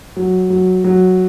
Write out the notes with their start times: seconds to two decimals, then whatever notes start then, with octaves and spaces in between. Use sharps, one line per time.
0.17 F#3
0.50 F#3
0.84 F#3